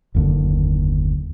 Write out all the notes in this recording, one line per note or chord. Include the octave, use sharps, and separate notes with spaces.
F#1 D#2 D3